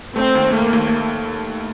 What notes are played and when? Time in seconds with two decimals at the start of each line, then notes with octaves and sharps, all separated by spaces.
0.16 A3 C4
0.35 D#2
0.53 A3 A#3
0.73 D#2